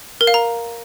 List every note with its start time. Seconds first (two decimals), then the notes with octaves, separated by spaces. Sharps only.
0.21 A#4
0.27 F5
0.34 A#5